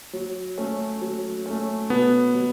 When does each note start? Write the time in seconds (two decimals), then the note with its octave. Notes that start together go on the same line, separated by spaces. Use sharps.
0.13 F#3
0.58 A3 C#4
1.02 F#3
1.46 A3 C#4
1.90 B2 B3
2.34 F#3